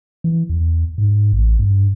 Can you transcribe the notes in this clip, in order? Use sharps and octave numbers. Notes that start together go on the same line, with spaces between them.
E3
E2
G#2
A1
G2